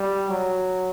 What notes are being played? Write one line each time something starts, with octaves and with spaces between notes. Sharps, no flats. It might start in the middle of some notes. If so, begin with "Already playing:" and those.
Already playing: G3
F#3